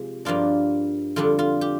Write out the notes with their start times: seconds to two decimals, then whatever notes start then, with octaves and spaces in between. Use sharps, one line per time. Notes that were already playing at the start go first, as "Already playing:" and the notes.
Already playing: C3 F3 G#3
0.25 G2 F3 A#3 D4 F4
1.16 F2 D3 G3 D4 F4
1.39 F4
1.61 G4